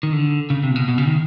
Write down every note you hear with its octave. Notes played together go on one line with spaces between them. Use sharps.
D#3
D3
C#3
C3
A#2
B2
B2
C#3
D#3